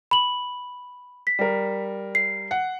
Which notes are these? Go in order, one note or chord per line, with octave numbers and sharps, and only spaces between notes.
B5 F#7
B6
G3 A#4
C7
F#5